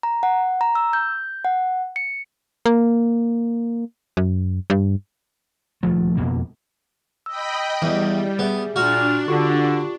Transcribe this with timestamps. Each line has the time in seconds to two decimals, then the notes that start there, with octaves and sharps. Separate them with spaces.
0.03 A#5
0.23 F#5
0.61 A#5
0.75 E6
0.93 G6
1.45 F#5
1.96 C#7
2.66 A#3
4.17 F#2
4.70 G2
5.83 D#1 D2 F3 A3
6.17 E1 F2 B2 A#3
7.26 D#5 G5 B5 E6
7.82 E2 G3 E4 D#5
8.39 B3 G#4 E5
8.76 A#2 D4 F#4 F6
9.28 D3 F4 G4 C#6